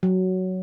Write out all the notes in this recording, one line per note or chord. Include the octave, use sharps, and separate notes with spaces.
F#3